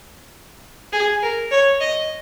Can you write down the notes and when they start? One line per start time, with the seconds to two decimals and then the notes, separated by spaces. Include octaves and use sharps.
0.93 G#4
1.22 A#4
1.51 C#5
1.80 D#5